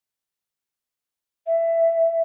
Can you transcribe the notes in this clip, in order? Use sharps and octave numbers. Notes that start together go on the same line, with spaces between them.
E5